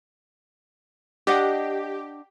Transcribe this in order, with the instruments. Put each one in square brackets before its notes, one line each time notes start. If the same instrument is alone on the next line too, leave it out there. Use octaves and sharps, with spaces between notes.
[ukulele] D4 D#5 F#5 [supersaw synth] G4